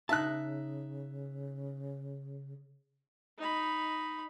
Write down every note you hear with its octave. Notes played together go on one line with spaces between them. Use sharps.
C#3 D#4 E5 A5 F#6
D#4 B5